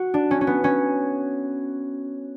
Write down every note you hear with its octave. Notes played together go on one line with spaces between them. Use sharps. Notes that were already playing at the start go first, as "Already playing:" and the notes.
Already playing: F#4
D4
C#4
C#4
B3
C#4